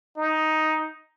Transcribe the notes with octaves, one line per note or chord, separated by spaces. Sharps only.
D#4